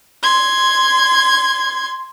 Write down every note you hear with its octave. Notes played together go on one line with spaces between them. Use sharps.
C6 G#6